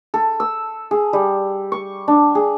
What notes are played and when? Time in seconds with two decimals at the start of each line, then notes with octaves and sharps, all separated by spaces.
0.14 A4
0.40 E6
0.91 G#4
1.13 G3
1.72 C#6
2.08 D4
2.35 G#4